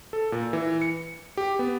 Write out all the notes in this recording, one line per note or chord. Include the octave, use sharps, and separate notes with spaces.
A4
A#2
E3
C#7
G4
B3